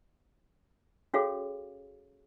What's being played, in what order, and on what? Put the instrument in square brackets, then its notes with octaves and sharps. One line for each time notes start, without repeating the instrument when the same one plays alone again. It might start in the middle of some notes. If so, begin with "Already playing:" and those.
[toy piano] C#4 F#4 G#4 A4 C#5 F5